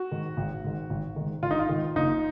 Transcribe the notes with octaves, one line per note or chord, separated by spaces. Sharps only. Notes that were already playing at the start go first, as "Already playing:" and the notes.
Already playing: F#4
G#2 D#3
G#1
G#2 D#3
G#1
G#2 D#3
G#1 F4
D#4
F4
G#2 D#3
F#1 D#4